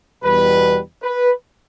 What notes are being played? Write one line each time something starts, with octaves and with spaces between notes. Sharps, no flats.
E2 B2 G3 B4
B4